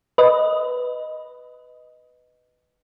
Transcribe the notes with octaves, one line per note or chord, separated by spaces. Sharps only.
B4 D#5